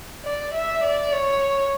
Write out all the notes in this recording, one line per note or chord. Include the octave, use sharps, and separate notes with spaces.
D5
E5
D5
C#5